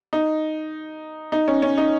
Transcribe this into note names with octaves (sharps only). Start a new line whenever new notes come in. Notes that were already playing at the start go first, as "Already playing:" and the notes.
D#4
D#4
C#4
C#4
D#4